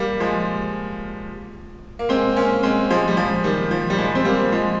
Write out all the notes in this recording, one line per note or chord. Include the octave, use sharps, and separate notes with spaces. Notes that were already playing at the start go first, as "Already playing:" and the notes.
Already playing: G3 A#3
F3 G#3
A#3
G#3 C4
A#3 C#4
G#3 C4
F3 G#3
G3
F3
D#3 G3
F3
G3
F3 G#3
C4
G3 A#3
F3 G#3